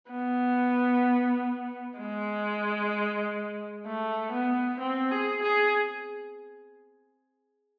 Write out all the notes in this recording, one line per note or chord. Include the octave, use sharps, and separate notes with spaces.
B3
G#3
A3
B3
C4
G#4
G#4